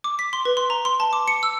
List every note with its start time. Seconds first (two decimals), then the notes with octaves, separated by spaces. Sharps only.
0.04 D6
0.19 B6
0.33 C6
0.45 B4
0.57 C6
0.70 A#5
0.85 C6
1.00 A5
1.13 D6
1.28 C#7
1.43 E6